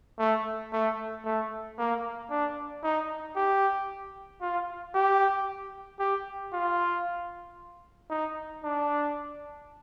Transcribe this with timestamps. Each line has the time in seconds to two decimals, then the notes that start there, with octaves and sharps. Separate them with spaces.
0.19 A3
0.73 A3
1.25 A3
1.78 A#3
2.30 D4
2.83 D#4
3.36 G4
4.41 F4
4.94 G4
5.99 G4
6.52 F4
8.10 D#4
8.63 D4